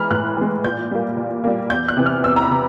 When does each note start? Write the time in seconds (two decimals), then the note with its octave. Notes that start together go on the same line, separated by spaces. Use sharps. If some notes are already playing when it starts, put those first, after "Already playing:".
Already playing: E3 G#3 A#5 B5 F6
0.11 A2 F#6
0.37 E3 G#3
0.64 A#2 G6
0.91 G3 A#3
1.17 A#2
1.44 G3 A#3
1.70 E2 G6
1.88 F#6
1.97 C3 E3
2.06 F6
2.24 E2 E6
2.36 A#5
2.42 B5
2.51 C3